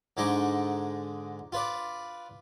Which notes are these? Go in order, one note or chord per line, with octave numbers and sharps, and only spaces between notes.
G#2 D3 G#3 D#4 C#6 D6
F4 B4 D5